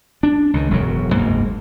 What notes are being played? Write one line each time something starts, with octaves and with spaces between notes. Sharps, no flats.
D4
C#2 D#3
E1 B1 F#2 F#3
F#1 D2 G#2 A#3